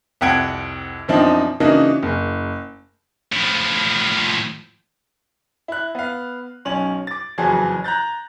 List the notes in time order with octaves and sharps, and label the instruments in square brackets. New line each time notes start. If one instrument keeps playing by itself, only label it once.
[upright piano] C2 F2 F#5 G5 G#6 D7
F#2 B2 F3 C4 D4 D#4
C#3 E3 A#3 D4 D#4 F#4
F#1
[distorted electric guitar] A2 F3
[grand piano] E4 F#6
B3 F5
B1 C#4 F#7
D6 A6
F#1 F2 E3 F#3 G#4 A5
A#5 F#6 G6 A6